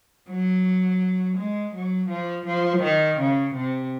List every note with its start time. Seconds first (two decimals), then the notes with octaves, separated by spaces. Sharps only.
0.29 F#3
1.38 G#3
1.75 F#3
2.10 F3
2.47 F3
2.83 D#3
3.20 C#3
3.56 C3